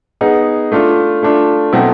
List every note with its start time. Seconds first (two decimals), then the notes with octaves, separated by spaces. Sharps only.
0.21 B3 D#4 G#4
0.72 A3 D4 F4
1.23 A3 D4 F4
1.73 B2 F#3 A3 C4 E4